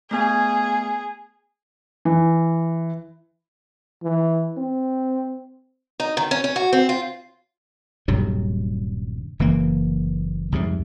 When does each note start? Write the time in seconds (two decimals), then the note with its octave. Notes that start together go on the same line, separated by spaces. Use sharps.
0.11 A3 B3 G#4 G#6
2.05 E3
4.03 E3
4.58 C4
6.00 D#4
6.17 D#3
6.31 C#4
6.44 C#4
6.56 F#4
6.73 C4
6.89 F4
8.08 D#1 G2 C3 F#3
9.39 F#1 E3 A#3
10.52 C2 F2 G#2 C3